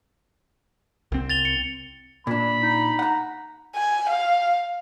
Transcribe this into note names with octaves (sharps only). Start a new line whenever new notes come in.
C2 C4
A6 F7 G7
C#7
A#2 D4 B5
D#4
F#5 A#5
G#5
F5